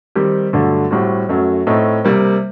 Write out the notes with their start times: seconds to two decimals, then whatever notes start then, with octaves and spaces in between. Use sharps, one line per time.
0.15 D#3 G3 C4 G4
0.53 G2 D3 F#3 A3
0.91 A2 G3 C4 F#4
1.29 F#2 F#3 A3
1.67 A2 A3 C4 D#4
2.05 C3 G3 A#3